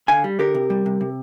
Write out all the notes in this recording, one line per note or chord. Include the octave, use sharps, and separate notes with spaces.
D3 F5 G#5
G3
D3 G4 A#4
C3
G3
C3
C3